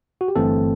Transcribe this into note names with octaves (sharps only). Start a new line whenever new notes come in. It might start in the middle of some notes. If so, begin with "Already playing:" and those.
F#4
G4
G1 G2 E3 A3 C4 A4